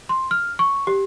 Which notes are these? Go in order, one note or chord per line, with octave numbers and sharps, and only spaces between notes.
C6
F6
C#6
G4